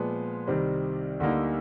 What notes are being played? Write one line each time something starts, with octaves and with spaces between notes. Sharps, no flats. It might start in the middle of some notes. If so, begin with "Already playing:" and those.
Already playing: A#2 F3 G#3 B3
C2 C3 D#3 G3 C4
D2 D3 G3 A#3 D#4